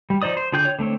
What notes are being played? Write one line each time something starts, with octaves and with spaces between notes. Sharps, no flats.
G3
F3 D#4 C5 D5 D#6
C5
D3 F4 G#4 G5 G6
C#5
D3 A3 C4 C#5